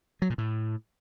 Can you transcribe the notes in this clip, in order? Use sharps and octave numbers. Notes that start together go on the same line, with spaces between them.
F#3
A#2
A2